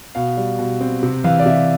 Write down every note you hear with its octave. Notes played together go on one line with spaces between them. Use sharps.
B2 F5
G3
B2
C4
C3
E3 F5
D5
C3 E5